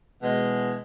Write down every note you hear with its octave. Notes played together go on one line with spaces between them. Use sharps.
B2 E3 G#3